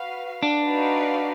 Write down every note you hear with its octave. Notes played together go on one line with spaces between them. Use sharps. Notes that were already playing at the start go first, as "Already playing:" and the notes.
Already playing: F#4 B4 F5
D4
D#4 F#4 B4 D5 F5